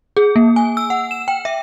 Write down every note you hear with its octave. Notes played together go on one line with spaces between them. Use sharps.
G#4
A#3
G#5
E6
F#5
E7
G5
E5